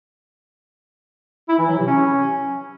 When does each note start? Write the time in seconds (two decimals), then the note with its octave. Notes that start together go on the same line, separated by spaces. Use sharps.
1.49 E4
1.59 E3
1.68 F#3
1.78 C3
1.87 C#4